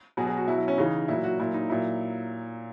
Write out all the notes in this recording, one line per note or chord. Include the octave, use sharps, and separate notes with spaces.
B2 F#3 G#4
G#4
F#4
B2 F#3 E4
E4
C#4
C#3 E3 D#4
A#2 F#3 E4
F#4
A#2 F#3 E4
D#4
A#2 F#3 E4